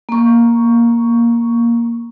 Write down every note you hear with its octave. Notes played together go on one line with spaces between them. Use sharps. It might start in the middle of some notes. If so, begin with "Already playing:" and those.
A#3 C#6